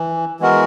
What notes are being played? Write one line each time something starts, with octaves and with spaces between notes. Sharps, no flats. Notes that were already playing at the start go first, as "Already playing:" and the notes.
Already playing: E3
E3 G#3 B3 F#4 A#4